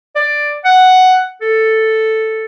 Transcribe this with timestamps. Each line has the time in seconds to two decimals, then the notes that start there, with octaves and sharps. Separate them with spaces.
0.16 D5
0.65 F#5
1.42 A4